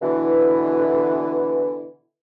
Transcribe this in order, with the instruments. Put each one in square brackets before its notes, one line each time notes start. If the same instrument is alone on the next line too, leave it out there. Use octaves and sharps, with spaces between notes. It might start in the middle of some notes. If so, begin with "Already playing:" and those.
[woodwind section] B2 D3 E3